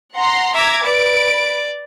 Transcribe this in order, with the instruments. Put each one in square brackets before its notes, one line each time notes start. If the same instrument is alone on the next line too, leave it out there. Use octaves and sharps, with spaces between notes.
[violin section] F#5 A#5 C6
[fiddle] E5 [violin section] A#5 D6 G#6
[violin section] B4 D7 [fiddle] D5